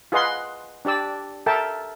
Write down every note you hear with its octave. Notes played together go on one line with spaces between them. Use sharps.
F4 G#4 B4 D#5 F#5 C6
D4 G4 D5 E6
A4 A#4 E5 G5 A5